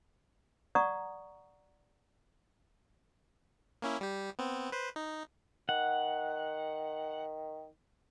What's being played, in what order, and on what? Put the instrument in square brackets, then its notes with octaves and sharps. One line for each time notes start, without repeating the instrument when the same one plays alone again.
[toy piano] D5 F#5 A#5 C#6 D#6
[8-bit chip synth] A#3 C#4 E4
G3 G4
B3 C4
B4 C5
D#4
[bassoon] D#3 [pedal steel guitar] F#5